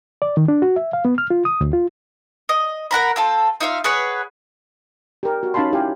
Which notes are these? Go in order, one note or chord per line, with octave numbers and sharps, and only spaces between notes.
D5
D#3
D4
F#4
E5
F5
B3
F6
F4
D#6
D2
F4
D#5
A#4 F#5 A#5 B5
C4 F4 A4
D#4 F4 E5 F5
G#4 B4 C#5 F#5
G4 A#4
F#4
C#4 D#4 F5 A5 B5 C6
E4 G4 F5 G#5